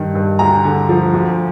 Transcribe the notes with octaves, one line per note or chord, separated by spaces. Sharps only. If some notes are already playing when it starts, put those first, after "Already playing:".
Already playing: G2 D#3
G2
D2 A#5
D3
F3
D2